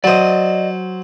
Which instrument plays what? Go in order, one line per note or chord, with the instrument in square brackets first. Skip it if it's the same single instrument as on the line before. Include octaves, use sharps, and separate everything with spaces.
[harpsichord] F#3 C5 [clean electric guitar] D5 D#5